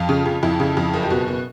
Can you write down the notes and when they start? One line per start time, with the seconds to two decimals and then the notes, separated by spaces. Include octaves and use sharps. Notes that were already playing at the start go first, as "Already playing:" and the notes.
Already playing: F2 F4
0.09 C#3
0.26 C#3
0.43 F2 E4
0.60 C#3
0.77 F2
0.94 F#1
1.03 G4
1.10 B2 F#4
1.28 B2